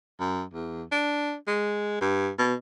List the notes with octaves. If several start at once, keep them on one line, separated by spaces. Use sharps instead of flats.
F#2
E2
D4
G#3
G2
B2